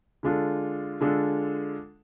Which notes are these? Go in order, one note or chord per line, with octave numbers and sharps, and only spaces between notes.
D3 G#3 D4 F4 A4
D3 G#3 D4 F4 A4